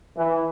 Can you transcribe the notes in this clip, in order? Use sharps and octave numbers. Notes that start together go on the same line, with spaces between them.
E3